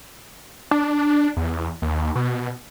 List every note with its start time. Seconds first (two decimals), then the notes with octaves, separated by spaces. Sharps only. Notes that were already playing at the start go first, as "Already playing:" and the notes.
0.71 D4
1.37 E2
1.82 D#2
2.16 B2